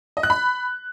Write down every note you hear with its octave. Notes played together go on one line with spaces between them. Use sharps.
D#5
F#6
B5